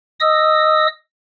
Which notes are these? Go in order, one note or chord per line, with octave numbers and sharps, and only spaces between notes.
D#5 D#6 E6